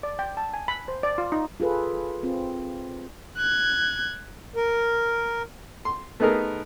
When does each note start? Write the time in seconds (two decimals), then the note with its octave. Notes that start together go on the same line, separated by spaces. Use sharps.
0.03 D5
0.19 G5
0.37 A5
0.53 G#5
0.68 B5
0.88 C5
1.03 D5
1.18 F4
1.32 D#4
1.60 F4 G#4 A4 B4
2.23 C4 F4
3.37 F#6 G#6
4.56 A#4
5.85 C6
6.20 A3 B3 D#4 G#4 A#4